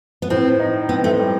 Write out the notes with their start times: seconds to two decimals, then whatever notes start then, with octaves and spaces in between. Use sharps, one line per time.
0.22 B3
0.30 A2 C4
0.60 D#4
0.89 B3 C4
1.04 A3
1.19 G3